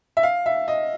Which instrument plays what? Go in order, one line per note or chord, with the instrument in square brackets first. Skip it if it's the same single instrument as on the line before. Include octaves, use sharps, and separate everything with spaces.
[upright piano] E5
F5
E5
D#5